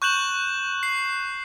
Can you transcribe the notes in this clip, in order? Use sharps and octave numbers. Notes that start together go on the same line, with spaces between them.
C#6 F#6 G6 E7 F#7
C7